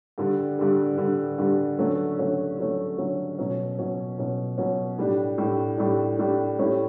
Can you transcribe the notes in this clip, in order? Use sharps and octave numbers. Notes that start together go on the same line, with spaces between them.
G2 D3 G3
G2 D3 G3
G2 D3 G3
G2 D3 G3
D3 F#3 A3 C#4
D3 F#3 A3 C#4
D3 F#3 A3 C#4
D3 F#3 A3 C#4
B2 F#3 C#4
B2 F#3 C#4
B2 F#3 C#4
B2 F#3 C#4
A2 G3 D4
A2 G3 D4
A2 G3 D4
A2 G3 D4
A2 G3 C#4 E4